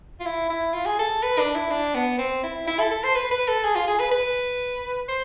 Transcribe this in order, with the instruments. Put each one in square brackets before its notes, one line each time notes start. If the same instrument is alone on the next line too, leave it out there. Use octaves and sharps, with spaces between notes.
[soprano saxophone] F4
E4
E4
F4
G#4
A4
B4
D4
E4
D4
B3
C4
E4
E4
A4
A4
C5
B4
B4
A4
G#4
F4
G#4
B4
B4
C5